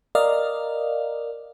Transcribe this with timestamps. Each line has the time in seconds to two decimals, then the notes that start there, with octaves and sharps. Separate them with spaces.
0.15 A#4 D5 D#5 F5